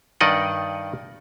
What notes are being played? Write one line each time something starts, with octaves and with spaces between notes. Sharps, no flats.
G2 D#3 D5 D#5 F#5